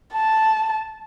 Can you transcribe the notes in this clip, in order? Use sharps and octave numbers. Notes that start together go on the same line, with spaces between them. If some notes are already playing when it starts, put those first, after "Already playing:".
A5